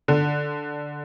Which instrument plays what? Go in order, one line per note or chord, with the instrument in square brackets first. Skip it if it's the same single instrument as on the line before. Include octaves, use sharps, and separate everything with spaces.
[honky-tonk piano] D3